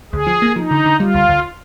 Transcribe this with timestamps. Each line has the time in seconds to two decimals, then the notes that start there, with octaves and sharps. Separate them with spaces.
0.13 D2 G#4
0.27 F3
0.42 A#3
0.56 F3 D#4
0.71 D3
0.86 D3
1.00 G3 F4
1.15 D2
1.29 D2